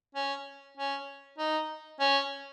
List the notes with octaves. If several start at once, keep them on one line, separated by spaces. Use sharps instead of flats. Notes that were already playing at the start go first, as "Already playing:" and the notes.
C#4
C#4
D#4
C#4